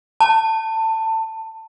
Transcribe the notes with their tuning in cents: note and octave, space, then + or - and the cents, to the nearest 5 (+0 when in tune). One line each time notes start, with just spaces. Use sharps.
A5 +20